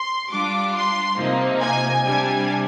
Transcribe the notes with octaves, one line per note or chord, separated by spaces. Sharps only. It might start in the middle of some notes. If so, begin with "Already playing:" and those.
Already playing: C6
G3 D4 F4 D6
C6
C3 F3 A#3 D#4
G#5
C3 G3 D4 G#5